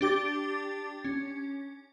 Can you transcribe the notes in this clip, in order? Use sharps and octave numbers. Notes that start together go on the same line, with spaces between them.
D4 G4 D6 A6
C#4